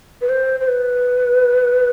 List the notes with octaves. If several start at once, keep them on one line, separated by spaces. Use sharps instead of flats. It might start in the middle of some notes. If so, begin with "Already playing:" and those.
B4
C5
C5
B4